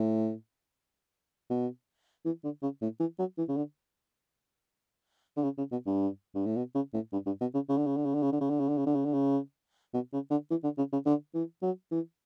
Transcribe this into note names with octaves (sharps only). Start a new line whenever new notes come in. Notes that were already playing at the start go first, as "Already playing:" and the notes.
Already playing: A2
B2
E3
D3
C#3
A2
E3
F#3
E3
C#3
D3
D3
C#3
C#3
B2
G2
G2
A2
B2
C#3
A2
G2
G2
B2
C#3
C#3
D3
C#3
D3
C#3
D3
C#3
D3
C#3
D3
C#3
D3
C#3
D3
C#3
D3
C#3
B2
C#3
D3
E3
D3
C#3
C#3
D3
E3
F#3
E3